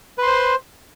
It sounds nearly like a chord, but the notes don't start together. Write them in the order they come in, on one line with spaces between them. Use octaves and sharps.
B4 C6 C5